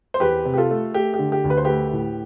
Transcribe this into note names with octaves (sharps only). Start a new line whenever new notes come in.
C5
E2 G4 B4
C3
G4
F4 A4
A3
A3 G4
G4
D3
G4
D2
B4
C5
A3 G4 B4
A2